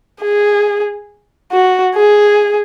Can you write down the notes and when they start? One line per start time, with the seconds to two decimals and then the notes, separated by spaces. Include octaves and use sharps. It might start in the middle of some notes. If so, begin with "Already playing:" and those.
0.22 G#4
1.52 F#4
1.95 G#4